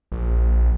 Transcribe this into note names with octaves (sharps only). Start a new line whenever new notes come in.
A#1